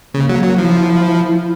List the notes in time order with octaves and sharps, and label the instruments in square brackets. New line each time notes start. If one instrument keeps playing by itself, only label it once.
[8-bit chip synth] C#3 [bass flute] A#3
[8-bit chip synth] F#3
F#3
[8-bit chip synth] F3 [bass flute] E4